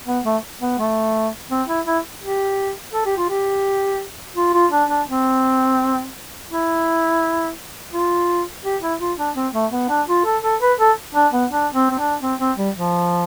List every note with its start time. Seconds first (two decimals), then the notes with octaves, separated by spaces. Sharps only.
0.07 B3
0.25 A3
0.61 B3
0.79 A3
1.50 C4
1.68 E4
1.86 E4
2.22 G4
2.93 A4
3.06 G4
3.17 F4
3.30 G4
4.36 F4
4.54 F4
4.72 D4
4.89 D4
5.08 C4
6.51 E4
7.93 F4
8.64 G4
8.82 E4
9.00 F4
9.18 D4
9.36 C4
9.54 A3
9.72 B3
9.89 D4
10.08 F4
10.25 A4
10.43 A4
10.61 B4
10.79 A4
11.15 D4
11.33 B3
11.51 D4
11.74 C4
11.91 C4
11.98 D4
12.22 C4
12.40 C4
12.58 G3
12.76 F3